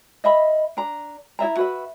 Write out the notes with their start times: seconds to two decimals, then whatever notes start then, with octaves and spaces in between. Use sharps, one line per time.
0.24 D#5 E5 B5
0.77 D4 A#5
1.39 E4 D#5 E5 A#5
1.56 F#4 B4 E5